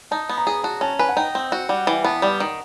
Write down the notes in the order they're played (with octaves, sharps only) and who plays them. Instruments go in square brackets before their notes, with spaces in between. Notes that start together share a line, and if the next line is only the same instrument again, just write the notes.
[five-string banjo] D#4 [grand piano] A5
[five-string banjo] B3
[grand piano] A#5
[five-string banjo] G#4
[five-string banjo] F#4 [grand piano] A5
[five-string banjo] C#4 [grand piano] A5
[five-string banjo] B4 [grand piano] G#5
[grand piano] F#5
[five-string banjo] D#4 [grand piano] G5
[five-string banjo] C4
F#4
[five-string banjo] G3 [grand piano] F#5
[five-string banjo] E3 [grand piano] G5
[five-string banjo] B3 [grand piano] A5
[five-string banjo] G3
D#3